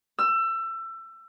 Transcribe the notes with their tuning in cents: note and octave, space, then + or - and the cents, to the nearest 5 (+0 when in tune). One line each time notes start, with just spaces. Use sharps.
E6 +25